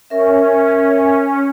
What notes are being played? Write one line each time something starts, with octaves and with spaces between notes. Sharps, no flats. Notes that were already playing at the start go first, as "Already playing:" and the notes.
C#4 A#4 E5